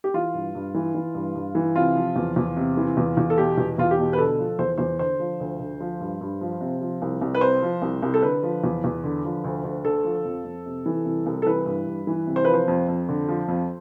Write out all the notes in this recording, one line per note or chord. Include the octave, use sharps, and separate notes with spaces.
G4
E3 F4
G2
G2
E3
E3
G2
G2
E3
C3 F4
F3
E2
E2
C3
E3
E2
E2
A4
B2 G4
E2
E2 F4
G4
B2
B4
D3 A4
F3
E2 C5
E2 C5
D3 C5
F3
D2
D2
F3
G2
G2
F3
C3
F3
C2
C2
B4
C3 C5
F3
C2
C2
A4
D3 B4
F3
E2
E2
D3
F3
D2
D2
D3 A4
F3
F2
F2
C3
E3
C2
C2
A4
E3 B4
G2
G2
E3
C3
C5
F3 B4
C5
F2
F2
D3
F3
F2